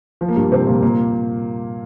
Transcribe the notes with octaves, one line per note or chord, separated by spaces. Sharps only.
F3
A#3
G2 G3
C3 C4
A#2 A#3
A#2 A#3